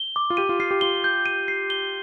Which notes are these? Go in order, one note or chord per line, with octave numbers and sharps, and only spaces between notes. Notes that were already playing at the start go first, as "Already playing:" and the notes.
Already playing: G7
D6
F4
G4 D#7
F4
F4 C7
G4
F4 G7
G6
D#7
C7
G7